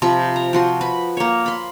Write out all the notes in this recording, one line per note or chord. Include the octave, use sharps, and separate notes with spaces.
C3 F3 B5
A#5
F3 F#4 C6
B4 B5
A#3 C#5
B5 C6